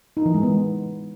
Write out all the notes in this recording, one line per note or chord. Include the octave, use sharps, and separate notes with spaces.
D#4
E3
G#3
B3